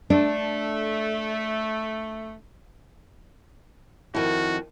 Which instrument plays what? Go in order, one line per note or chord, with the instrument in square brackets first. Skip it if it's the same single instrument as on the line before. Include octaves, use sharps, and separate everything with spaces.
[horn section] A3 [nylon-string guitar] D4
[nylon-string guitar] F2 D#3 [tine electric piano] E4 [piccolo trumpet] F#4